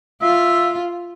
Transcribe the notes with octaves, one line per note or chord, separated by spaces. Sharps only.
F4 E5